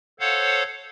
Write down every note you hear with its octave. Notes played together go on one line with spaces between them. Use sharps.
A4 C5 C#5 F5 F#5